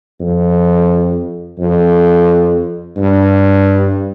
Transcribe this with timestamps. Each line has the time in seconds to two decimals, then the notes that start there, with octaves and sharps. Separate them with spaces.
0.21 F2
1.59 F2
2.97 G2